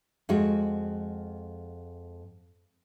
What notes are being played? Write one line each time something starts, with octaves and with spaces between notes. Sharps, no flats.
F2 G#3 F#4